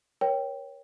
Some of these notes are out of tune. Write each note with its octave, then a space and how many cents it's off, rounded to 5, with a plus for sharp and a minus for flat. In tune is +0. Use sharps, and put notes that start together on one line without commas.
A#4 +35 C#5 +0 G5 +0